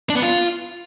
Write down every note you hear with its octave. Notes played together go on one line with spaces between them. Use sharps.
D4
B3
F4